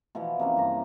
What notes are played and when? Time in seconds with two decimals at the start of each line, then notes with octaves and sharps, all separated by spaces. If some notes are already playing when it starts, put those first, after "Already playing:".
0.15 B2 E3 F3 B3
0.39 C3 A#3 C#4
0.57 G2 A#5